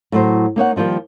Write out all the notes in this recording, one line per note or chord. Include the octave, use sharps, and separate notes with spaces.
A2 F#3 C5
A#3 D#4 C#5 F#5
D#3 F3 G3 A#3